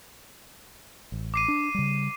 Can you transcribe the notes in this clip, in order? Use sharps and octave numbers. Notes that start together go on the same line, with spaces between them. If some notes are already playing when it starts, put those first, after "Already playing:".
A1
D6 C7 D#7
D4
C#3 G3